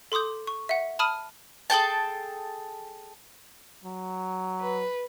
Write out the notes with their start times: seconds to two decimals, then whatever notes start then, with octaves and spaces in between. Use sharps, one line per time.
0.12 A4 C6 D6 D#6 G6
0.47 C#6
0.69 E5 F#5
0.99 A5 B5 D#6 F6 D#7
1.70 G#4 A4 G5 A5
3.84 F#3
4.61 B4